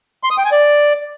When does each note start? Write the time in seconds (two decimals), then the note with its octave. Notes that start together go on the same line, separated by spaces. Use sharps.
0.24 C6
0.31 D#6
0.38 G5
0.45 G#5
0.52 D5